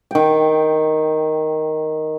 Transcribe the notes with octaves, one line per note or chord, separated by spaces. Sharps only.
D#3 G5